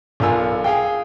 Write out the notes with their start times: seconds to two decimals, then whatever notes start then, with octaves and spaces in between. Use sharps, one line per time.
0.20 B1 D4 F4 A#4 G#5 E6
0.64 G#4 F5 G5